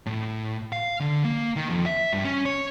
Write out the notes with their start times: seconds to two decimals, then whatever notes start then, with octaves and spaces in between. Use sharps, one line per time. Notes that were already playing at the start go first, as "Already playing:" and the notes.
0.06 A2
0.73 F5
1.00 D3
1.25 A#3
1.56 D#3
1.69 F2
1.86 E5
2.13 G2
2.24 C#4
2.46 C#5